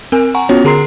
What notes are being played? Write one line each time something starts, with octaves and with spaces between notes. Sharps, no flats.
C4 A#4 G#5
F#5 G#5 A#5 C#6
B3 C#4 F4 F#4 C#5
D3 G#4 A#4 A#5 C6 C7